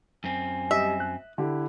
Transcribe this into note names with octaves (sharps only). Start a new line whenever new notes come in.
F#2 C4 G#5
G3 D#5 E5
F#6
D3 E4 G4